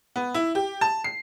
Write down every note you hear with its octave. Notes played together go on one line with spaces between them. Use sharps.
B3
E4
G4
A5
C7